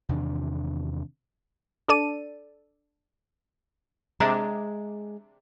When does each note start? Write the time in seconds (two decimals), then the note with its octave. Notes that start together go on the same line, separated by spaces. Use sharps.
0.09 E2 C3 D#3 D4
1.88 D4 A4 D5 D#7
4.20 C3 G#3 D4 E5 A#5